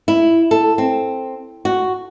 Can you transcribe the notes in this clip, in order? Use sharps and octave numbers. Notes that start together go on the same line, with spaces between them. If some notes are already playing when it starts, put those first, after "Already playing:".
E4
A4
C4
F#4